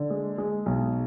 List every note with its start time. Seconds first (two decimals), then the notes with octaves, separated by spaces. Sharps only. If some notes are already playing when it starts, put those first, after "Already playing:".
Already playing: D3
0.10 G#3
0.38 G#3
0.66 B1